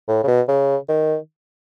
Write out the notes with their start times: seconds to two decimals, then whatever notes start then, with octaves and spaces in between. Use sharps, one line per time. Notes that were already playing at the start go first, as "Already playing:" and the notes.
0.08 A2
0.24 C#3
0.27 B2
0.48 C#3
0.88 D#3